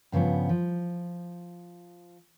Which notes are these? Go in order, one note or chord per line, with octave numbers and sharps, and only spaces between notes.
G2 C#3 F3 B3
F3